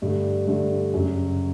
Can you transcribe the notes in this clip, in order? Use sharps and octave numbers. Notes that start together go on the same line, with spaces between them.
G2 D3 A3
G2 D3 A3
F#2 C#3 F#3